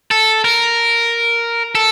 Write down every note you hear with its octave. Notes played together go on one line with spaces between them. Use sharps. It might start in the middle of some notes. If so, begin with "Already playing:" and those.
A4
A#4
A4